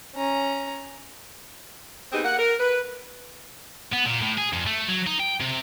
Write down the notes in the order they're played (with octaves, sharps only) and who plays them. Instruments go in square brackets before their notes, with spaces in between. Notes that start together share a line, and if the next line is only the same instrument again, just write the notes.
[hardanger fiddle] C#4 A#5
[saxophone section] B3 C4 D#4 G4 G#4
A#3 A#4 F#5
A#4
B4
[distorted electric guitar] B3
A#2
A2
G#4
F2
A3
F#3
D#4
G5
C3